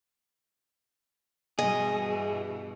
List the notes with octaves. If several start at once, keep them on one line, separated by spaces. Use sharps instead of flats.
G2 B2 E3 G#4 D#5